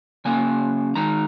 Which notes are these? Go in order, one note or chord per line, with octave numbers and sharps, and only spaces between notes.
C#3 A#3 C#4 G#5
D#3 G#3 D#4 A#5